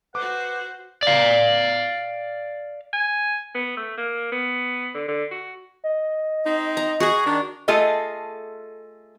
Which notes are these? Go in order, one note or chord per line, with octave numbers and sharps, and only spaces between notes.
F#4 B4 C5 F#5 D6
D5 F5
G#5
B3
A3
A#3
B3
D3
D3
F#4
D#5
C4 D#4
A#5
F#4 G#4 F#5
D#3 D4
A3 F4 G#4 A4 D#5